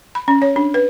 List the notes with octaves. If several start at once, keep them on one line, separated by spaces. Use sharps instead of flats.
B5
C#4
C#5
D4
B4